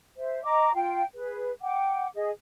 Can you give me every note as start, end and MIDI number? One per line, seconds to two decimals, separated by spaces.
0.17 0.43 72
0.17 0.43 76
0.44 0.71 75
0.44 0.71 82
0.44 0.71 86
0.74 1.02 65
0.74 1.02 77
0.74 1.02 79
1.16 1.51 68
1.16 1.51 71
1.61 2.07 78
1.61 2.07 79
1.61 2.07 86
2.15 2.30 68
2.15 2.30 75